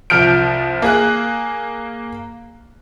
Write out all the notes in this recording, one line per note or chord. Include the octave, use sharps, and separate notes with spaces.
C2 F3 F6 G6 D7
A#3 G#4 F#6